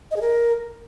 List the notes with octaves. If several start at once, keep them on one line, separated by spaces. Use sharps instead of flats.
D#5
G#4
A#4